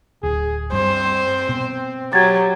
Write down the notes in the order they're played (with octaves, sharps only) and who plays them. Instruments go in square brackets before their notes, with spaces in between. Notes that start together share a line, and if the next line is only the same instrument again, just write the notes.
[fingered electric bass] D1 [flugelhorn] G#4
[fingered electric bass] G2 [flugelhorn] C4 [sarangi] C5
[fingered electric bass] B2
[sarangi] F#3 [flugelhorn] G4 [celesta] G#6 A6